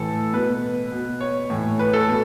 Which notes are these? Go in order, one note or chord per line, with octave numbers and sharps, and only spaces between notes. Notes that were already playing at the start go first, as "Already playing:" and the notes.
Already playing: A2 E3 A4
B2 B4
B2
C#5
A2 E3
B4
A4
B2